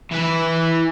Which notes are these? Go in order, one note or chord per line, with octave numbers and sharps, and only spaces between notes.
E3 B4